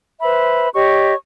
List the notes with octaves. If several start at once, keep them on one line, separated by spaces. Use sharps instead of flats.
B4 C5 E5 B5
G4 C#5 D#5 C#6